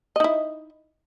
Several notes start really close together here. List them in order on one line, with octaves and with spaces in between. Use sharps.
D#5 D#4 E4